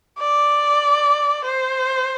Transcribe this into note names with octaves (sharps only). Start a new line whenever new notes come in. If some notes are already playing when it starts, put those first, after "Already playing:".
D5
C5